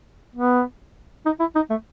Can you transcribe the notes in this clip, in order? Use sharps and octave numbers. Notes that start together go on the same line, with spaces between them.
B3
D#4
E4
D#4
A3